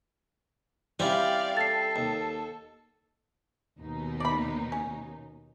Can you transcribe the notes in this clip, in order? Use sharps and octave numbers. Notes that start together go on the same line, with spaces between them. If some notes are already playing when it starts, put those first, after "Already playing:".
G3 C4 C#4 E4 D5 F5
A4 A6 C7
D#2
D#2 B2 D#4
D5 B5
C#4